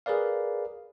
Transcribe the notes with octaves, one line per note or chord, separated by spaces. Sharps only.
G#4 A#4 B4 D5 F5